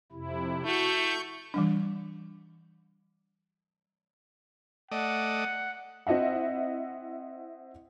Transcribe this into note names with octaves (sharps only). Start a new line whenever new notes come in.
F2 C3 E4
A3 E4 F#4 C#6 G6
E3 G3 D4
A3 D5 D#5 F#5
C4 E4 D#5 E5 F#5